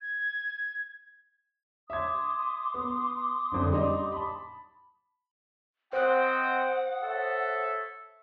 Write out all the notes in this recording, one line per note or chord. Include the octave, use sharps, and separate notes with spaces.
G#6
E5 C6 D6 D#6 G#6
B3
F#1 F2 D3
G3 D#4
A5 B5
C4 C5 D#5 F#5 G5 D#6 F#6
A4 C#5 E5